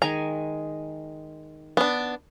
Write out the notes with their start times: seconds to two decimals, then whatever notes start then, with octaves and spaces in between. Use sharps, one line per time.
0.02 D#3 G#3 G#5 A#5
1.77 B3 D4